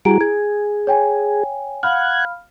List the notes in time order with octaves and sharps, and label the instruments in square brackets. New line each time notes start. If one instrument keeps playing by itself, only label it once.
[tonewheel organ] G3 F#4 G#4 [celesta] E4 A#5 D7
[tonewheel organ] G#4 [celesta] G#6
[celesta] C#5 G5 G#5
[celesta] F5 B5 F6 [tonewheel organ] F#5 F#6 G#6